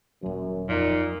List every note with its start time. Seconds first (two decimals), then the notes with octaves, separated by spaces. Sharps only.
0.23 D#1 F#2 F#3
0.69 F2 A#2 D#4